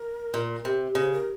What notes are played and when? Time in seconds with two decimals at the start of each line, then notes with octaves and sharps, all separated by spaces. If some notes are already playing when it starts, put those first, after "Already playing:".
Already playing: A#4
0.34 A#2
0.65 C3
0.95 C#3 C5
1.12 A#4